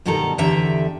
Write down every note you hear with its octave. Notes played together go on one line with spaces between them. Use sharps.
G2 B2 D#3 G3 A4 A#5
E2 D3 G4 E5 A#5